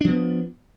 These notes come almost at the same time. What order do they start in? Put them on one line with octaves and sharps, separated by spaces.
D4 F3 B3